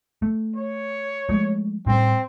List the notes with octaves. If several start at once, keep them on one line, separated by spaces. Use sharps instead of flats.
A3
C#5
F3 G#3 A3
A2 G3 C4